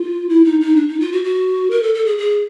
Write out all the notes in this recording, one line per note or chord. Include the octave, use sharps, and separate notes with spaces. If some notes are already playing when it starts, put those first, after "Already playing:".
Already playing: F4
E4
D#4
D#4
D4
D#4
F4
F#4
F#4
A#4
A4
A4
G#4
G#4